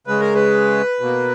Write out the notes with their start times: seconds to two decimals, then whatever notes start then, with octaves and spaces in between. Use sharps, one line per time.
0.07 C#3 G#3 B4
0.20 A#4
0.35 B4
1.00 B2 A#3